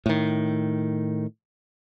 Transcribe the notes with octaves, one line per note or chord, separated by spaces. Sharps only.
A2 D#3